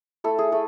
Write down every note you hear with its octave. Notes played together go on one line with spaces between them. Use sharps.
A3 E4 A4
G#4
A3 A4